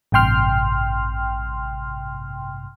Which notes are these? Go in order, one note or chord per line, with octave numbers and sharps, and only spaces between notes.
A1 G2 C3 G5 C6 F6